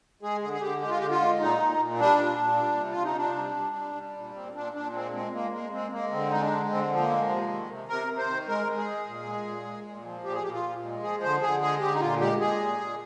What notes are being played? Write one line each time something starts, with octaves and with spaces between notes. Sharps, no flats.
G#3 G#4
D3 G#4
G#4
D3 G4
G#3 G4
F4
D3 G4
F4
G#3
A#2 D#4
A#2
A#2
G3 D4
A#2
A#2
G3
C3
F4
C3
D#4
C3 D4
G3
G3
G3
G3
A#2
A#2 C4
A#2 D4
A#2 D4
G#3 C4
G#3 C4
G#3 A#3
G#3 A#3
G#3 C4
G#3 A#3
D3 C4
G#3 D#4
D4
D3
D3 C4
F3
A#3
G#3
C3
D#3
C3
C3 A#4
C3
C5
D#3
G#3 A#4
G#3
G#4
G#3
A#2
G#3
A#2
G#3
A#2
F3
A#2 G4
G#4
A#2 G4
F4
A#2
G#3
F3 G#4
D3 C5
D3 G#4
G#3 G#4
D3 G4
D#4
A#2 F4
G#3 G4
G#3 G#4
A#2
A#2